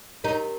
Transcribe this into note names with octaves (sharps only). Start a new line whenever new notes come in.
D#4 G4 A#4